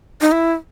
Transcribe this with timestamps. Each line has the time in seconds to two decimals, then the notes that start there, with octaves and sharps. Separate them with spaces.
0.21 D#4
0.32 E4